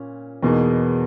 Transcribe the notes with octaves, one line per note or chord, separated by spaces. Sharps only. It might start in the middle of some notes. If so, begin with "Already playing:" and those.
Already playing: A#2 C#4
E2 B2 A#3 D#4 G#4